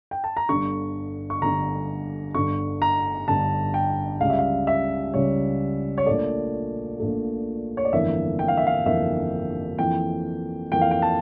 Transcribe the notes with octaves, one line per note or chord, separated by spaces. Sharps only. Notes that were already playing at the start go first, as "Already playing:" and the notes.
G5
A5
A#5
G1 G2 D3 C#6
C#6
G1 G2 D3 A#5
G1 G2 D3 C#6
A#5
G1 G2 D3 A5
G5
C#2 C#3 G3 F5
E5
F5
E5
C#2 C#3 G3 C#5
C#5
A#1 A#2 A3 D5
A#1 A#2 A3
C#5
D5
G1 F2 E3 A#3 E5
G5
F5
E5
F5
G1 F2 E3 A#3 E5
F2 E3 A#3 G5
F2 E3 A#3 G5
F5
G5
A5